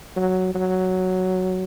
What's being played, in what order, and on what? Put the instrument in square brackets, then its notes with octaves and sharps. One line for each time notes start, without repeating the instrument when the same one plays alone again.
[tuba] F#3
F#3